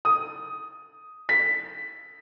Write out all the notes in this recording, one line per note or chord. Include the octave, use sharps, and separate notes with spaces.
D#6
B6